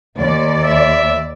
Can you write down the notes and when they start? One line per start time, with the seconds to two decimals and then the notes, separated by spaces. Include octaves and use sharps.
0.17 D#2 D5
0.64 E5